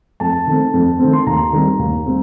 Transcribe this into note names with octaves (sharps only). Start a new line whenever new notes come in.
F2 A5
D#3 A3 C4
F2
D#3 A3 C4
C6
D#2 A#5
D#3 G3 C4
D#2
G3 C4